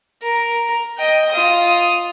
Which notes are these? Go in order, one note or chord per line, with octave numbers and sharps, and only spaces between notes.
A#4
D#5 G5
F4 D#6